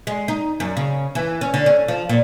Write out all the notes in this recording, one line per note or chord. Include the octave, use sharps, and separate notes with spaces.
G#3
D#4
F#2
C#3
E3
C#4
D3
C#4
F3
A#2